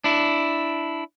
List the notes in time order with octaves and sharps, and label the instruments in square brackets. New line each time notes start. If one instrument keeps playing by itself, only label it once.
[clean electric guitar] D4 E4